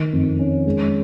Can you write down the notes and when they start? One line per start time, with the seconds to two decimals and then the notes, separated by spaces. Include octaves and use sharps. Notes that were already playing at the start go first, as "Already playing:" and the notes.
Already playing: D#3
0.13 F2
0.39 C#4
0.66 G#3